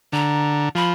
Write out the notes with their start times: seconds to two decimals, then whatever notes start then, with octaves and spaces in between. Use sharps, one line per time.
0.12 D3 A#5
0.75 F3 B5